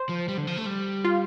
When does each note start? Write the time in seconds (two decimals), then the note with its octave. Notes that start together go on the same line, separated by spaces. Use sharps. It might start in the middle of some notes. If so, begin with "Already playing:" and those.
Already playing: C5
0.09 F3
0.28 G3
0.37 D3
0.47 F3
0.57 A3
0.66 G3
1.05 F4